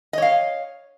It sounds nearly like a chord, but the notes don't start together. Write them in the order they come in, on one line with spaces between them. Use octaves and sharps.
D#5 C#5 F5